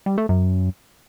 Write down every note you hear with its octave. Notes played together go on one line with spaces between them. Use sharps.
G3
A3
F#2